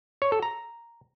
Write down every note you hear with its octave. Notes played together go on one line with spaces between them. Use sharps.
C#5
A4
A#5